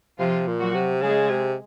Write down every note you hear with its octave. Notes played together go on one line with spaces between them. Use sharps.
C3 F3 F4
A#2
F#3 F#4
C3
C#3 G#3 G#4
C3